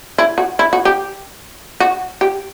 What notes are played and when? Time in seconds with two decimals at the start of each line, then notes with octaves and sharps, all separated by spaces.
0.18 E4
0.38 F#4
0.59 E4
0.73 F#4
0.85 G4
1.80 F#4
2.21 G4